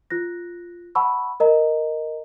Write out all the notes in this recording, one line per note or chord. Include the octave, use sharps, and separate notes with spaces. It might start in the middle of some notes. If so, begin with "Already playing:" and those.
F4 F#6 A#6
F#5 A5 B5 C#6 E6
A#4 D#5 A#5